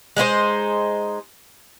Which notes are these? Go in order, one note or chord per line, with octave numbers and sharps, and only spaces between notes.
G#3 D#4 E4 C5